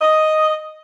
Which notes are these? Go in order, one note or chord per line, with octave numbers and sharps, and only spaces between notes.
D#5